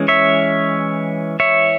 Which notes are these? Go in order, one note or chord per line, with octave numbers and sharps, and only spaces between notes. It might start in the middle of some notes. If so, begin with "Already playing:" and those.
Already playing: E3 G#3 C#4
C#5 E5
C#5 E5